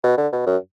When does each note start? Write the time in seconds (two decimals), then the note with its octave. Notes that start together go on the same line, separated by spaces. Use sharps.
0.04 B2
0.18 D3
0.32 B2
0.46 F#2